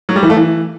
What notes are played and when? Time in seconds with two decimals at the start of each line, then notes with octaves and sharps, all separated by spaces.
0.09 F#3
0.16 G3
0.23 E3
0.30 A3
0.37 E3